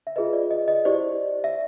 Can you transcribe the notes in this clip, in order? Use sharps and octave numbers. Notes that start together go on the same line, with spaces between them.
E5
F4 G#4 B4 D#5
D5
D#5
D#5
E4 G4 C5 D5
E5